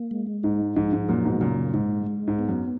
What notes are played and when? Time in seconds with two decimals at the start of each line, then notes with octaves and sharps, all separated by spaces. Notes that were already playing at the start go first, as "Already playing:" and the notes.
Already playing: A#3
0.11 G#3
0.43 G#2 D#4
0.76 G#2 F3
0.93 G#2
1.09 F#2 A#2 A#3
1.25 G#2 B2
1.41 F#2 A#2 C#3
1.73 G#2 G#3
2.07 G#3
2.27 G#2
2.39 B3
2.49 F#2